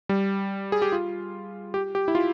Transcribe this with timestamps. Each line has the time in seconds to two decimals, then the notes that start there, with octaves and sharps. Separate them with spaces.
0.09 G3
0.72 G#4
0.82 G4
0.92 F4
1.74 G4
1.95 G4
2.08 E4
2.15 F4